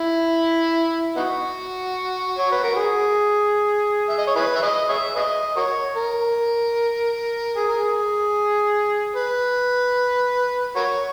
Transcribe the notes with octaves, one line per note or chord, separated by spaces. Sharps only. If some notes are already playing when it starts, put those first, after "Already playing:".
Already playing: E4
B3 D#4 F#4
C#5
B4
A#4
G#4
E5
D#5
C#5
E4 G#4 B4
E5
G#4 B4 D#5
G#4 C#5 E5
G#4 B4 D#5
F#4 A#4 C#5
A#4
G#4
A#4
G#4
B4
F#4 A#4 C#5